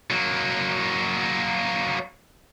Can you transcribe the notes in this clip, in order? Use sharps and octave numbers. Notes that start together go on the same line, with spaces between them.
F#3 A#3